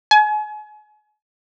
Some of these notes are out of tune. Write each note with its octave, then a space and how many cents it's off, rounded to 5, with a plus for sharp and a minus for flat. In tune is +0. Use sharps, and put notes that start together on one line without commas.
G#5 +35